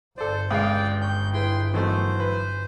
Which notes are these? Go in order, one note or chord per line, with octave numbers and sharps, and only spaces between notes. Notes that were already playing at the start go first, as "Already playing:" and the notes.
G1 A4 C5 D5
C#2 G#3 D5 F5 G5 D#6
G5 C#6 G6
E4 G#4 B4 G5 C6
D#3 E3 F#3 A3 B3 C5
B4